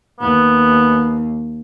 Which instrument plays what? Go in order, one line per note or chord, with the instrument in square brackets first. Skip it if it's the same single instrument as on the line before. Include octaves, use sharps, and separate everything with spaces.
[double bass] D#2 [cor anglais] B3